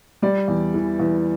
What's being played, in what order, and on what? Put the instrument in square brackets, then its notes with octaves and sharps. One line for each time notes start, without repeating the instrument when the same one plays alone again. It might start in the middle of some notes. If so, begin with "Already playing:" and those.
[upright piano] G3 D5
E2
E3
E2